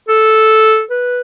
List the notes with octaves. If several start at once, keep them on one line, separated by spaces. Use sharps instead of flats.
A4
B4